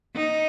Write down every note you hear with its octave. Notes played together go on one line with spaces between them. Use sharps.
D#4